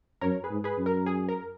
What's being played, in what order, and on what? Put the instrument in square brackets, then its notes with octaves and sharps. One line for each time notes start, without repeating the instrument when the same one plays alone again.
[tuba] F#2 [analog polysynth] A#4 C#5
[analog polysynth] G#4 B4
[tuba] G#2
[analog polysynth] G#4 B4
[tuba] F#2
[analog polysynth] A#4
G#4
A#4